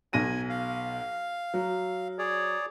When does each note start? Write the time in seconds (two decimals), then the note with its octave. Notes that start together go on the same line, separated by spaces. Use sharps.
0.13 B1 G#5 A#6 D#7
0.49 F5
1.54 F#3
2.19 G#4 C#5 D5